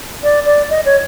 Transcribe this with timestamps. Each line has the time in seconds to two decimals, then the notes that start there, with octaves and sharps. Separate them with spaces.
0.23 D5
0.46 D5
0.70 D#5
0.85 C#5